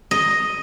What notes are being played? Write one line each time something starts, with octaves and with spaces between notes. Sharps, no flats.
D#5